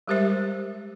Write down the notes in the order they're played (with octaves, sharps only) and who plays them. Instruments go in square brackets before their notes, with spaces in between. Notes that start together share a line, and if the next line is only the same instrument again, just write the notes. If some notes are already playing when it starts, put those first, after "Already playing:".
[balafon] G3 G#3 G4 A#4 C5 E5